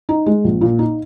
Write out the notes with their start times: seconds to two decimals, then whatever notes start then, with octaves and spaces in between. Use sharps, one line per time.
0.09 D#4
0.26 G#3
0.44 A#1
0.61 A#2
0.79 D#4